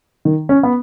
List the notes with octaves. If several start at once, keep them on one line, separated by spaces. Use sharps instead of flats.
D#3
C#4
B3